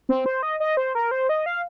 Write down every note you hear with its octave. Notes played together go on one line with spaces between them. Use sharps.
C4
C5
D#5
D#5
C5
A#4
C5
D#5
F5